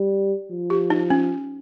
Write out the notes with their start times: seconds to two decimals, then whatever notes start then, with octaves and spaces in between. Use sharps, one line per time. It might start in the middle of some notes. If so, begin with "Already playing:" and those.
Already playing: G3
0.51 F3
0.70 G4
0.90 D#4
1.10 C#4